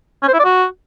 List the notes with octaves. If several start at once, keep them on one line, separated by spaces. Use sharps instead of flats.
C#4
C5
E4
D5
F#4